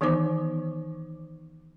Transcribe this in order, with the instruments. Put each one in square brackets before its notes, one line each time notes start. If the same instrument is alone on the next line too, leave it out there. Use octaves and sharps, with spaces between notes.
[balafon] D#3 E3 B3 D#4 C5 D6